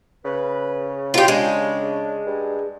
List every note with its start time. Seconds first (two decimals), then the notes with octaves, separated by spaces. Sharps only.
0.25 C#3 B4
1.14 G#2 E4 F4 G4
1.28 G#3 D4
2.26 G2